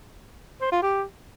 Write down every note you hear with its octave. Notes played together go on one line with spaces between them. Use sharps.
C5
F4
G4